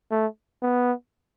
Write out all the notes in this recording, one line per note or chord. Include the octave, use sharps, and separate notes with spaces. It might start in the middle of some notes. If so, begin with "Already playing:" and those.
A3
B3